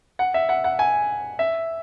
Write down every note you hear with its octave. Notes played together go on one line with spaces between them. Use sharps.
F#5
E5
F#5
F#5
G#5
E5